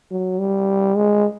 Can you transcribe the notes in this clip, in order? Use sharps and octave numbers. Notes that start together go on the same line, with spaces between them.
F#3
G3
G#3